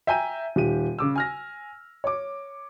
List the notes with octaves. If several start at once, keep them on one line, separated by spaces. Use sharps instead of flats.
E5 G5 G#5 A#5 G6 D#7
D#1 G4 D#7
C#3 D6 E6
G#5 F6 A#6
C#5 D6